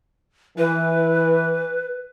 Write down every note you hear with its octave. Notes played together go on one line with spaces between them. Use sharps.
E3 B4